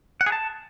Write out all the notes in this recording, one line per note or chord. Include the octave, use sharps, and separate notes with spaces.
F#5
G#4
A5